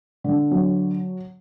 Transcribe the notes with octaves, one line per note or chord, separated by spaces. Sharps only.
D3
F#3